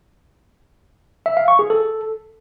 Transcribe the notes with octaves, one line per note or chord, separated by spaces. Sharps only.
E5
F5
C#6
G#4
A4